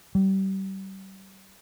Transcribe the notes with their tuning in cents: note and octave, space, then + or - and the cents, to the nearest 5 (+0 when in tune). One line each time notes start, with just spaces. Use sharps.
G3 -30